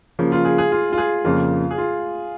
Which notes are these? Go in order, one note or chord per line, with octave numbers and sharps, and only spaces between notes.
C#3 F3 A#3
F4
G#4
G#4
F4
F4
G#4
F2 C#3 F3 A#3 F4
G#4
F4